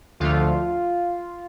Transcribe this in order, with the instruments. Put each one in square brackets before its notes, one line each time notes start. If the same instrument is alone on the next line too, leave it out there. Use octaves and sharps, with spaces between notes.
[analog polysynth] D2 D3 F3 A3 F4